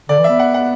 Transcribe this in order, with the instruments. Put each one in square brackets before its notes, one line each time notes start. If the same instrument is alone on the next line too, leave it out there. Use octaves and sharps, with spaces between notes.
[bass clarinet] D3 [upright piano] D5
[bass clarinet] E3
[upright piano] E5
[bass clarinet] B3
[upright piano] F#5
F#5